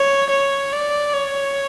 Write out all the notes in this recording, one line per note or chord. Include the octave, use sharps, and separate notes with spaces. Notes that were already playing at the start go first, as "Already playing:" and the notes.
Already playing: C#5
C#5
D5
C#5